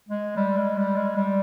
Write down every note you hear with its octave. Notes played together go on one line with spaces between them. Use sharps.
G#3
G3
G#3
G3
G#3
G3